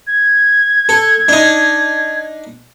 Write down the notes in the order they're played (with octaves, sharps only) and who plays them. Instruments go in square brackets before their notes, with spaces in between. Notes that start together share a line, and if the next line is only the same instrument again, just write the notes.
[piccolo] G#6
[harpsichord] A4
D4 D#4